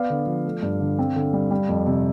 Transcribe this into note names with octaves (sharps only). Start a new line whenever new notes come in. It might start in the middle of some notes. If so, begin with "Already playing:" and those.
Already playing: B3 D5 F5
D3
F3
A3
G2
D3
C4
D3
G3
G3
F2
C3